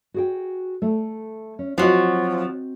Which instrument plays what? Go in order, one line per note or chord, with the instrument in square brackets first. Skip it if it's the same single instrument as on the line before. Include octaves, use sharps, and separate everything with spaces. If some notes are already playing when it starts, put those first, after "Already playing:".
[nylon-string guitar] F#4 G#4 G5
A3
C#4
[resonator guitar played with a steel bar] F3 F#3 [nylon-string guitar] C4 F#4 D#5